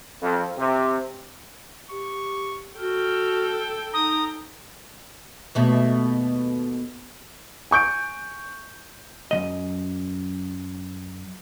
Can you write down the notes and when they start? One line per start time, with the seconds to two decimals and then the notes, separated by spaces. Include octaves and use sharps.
0.22 F2
0.58 C3
1.91 G4 C#6
2.80 F#4 A4 G5 F6
3.94 D#4 A#5 D#6
5.55 D#2 B2 A3
7.71 G#5 C#6 G6 D7
9.31 F#2 D#3 D#5